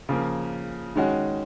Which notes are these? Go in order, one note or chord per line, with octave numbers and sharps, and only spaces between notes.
C#3 F3 A#3
D#3 G#3 C#4 F#4